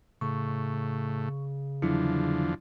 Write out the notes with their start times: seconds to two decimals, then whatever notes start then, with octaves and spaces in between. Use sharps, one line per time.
0.21 A2 C#3 C#6
1.82 E2 D3 F3 F#3 D4 E4